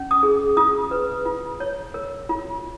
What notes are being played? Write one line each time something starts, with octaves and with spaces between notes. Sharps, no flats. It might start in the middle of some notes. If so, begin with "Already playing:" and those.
Already playing: C#4
D#6
G#4
F4 D#6
B4
F4
C#5
A#4
F4